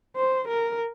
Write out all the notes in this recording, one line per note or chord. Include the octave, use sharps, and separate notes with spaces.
C5
A#4